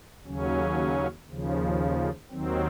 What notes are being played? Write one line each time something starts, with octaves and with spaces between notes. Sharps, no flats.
D#2 C#3 F#3 C#4
D#2 C#3 F3
D#2 D#3 F#3 C4